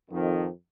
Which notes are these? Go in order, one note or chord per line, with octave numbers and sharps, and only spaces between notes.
F2 D#3